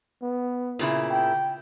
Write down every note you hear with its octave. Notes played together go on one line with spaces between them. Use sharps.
B3
A#2 C#3 E4
G5